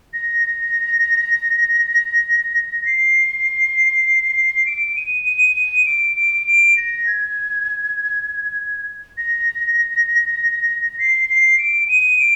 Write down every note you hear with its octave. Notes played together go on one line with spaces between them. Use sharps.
A#6
C7
D7
D#7
D#7
D#7
D7
D7
D7
A#6
G#6
A#6
C7
C7
D7
D#7
D7